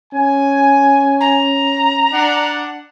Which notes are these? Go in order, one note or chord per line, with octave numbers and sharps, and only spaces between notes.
C#4 G#5
A#5
D4 F#5